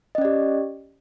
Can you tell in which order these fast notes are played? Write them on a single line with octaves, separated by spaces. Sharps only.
D#5 C#4 D5 G4